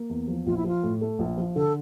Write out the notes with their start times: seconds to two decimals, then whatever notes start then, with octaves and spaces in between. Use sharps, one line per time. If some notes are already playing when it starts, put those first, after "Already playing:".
Already playing: A#3
0.09 E2
0.27 F3
0.46 A#1 F4
0.57 E4
0.64 F3 F4
0.83 A2
1.01 A3
1.19 A#1
1.37 F3
1.56 D3 A4